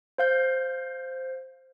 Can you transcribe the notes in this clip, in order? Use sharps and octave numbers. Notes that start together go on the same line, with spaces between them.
C5 F5 G6